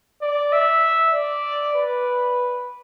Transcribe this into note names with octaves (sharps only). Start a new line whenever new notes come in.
D5
E5
D5
B4